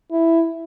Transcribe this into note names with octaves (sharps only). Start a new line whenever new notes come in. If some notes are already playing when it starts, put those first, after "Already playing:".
E4